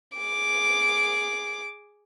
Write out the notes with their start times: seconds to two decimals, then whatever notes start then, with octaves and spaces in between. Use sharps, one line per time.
0.18 G#4 D6